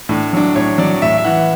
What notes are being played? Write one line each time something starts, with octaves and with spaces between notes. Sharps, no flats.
A2 D4
F#3 D4
A2 C#5
F#3 D5
A2 E5
E5
E3 F#5